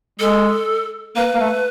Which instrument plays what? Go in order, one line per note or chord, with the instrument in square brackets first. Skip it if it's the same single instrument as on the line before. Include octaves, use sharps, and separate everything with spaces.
[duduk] G#3 [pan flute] A4
[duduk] A#3 [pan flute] B4
[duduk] A#3
A3